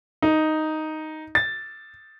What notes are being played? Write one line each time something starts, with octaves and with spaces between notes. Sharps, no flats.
D#4
A6